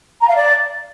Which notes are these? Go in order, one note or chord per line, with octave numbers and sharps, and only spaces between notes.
A#5
F5
D5